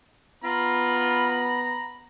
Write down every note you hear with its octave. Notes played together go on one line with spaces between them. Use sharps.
B3 F4 A#5 B5